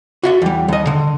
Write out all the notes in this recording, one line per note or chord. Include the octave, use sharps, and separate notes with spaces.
F#4 E5 F#5
E2 G3
D#2 D#5
D3